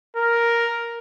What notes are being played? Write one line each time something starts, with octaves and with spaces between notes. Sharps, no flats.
A#4